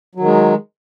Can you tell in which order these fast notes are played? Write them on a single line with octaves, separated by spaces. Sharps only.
F#3 D#3 G#3